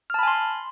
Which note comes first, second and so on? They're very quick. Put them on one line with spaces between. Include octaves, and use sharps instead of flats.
F6 A5 B5 G#5 C6